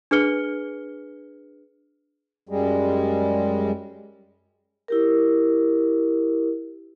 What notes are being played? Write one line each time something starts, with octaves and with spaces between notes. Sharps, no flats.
D4 G#4 B4 F6 C#7 G7
F#2 G3 G#3
E4 G4 A#4